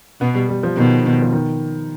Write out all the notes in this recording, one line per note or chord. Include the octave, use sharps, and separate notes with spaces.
B2 B3
G3
G3
F3
B2 D#3
D#3
F3
D#3